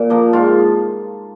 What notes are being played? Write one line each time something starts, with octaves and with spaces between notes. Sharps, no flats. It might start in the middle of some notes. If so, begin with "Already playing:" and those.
Already playing: A#2
F3 A#3
G#2 F4